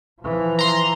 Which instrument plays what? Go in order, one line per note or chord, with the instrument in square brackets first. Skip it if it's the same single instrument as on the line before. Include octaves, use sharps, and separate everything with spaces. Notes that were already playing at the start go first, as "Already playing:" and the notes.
[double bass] E3 F3
[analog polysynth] A#5 C6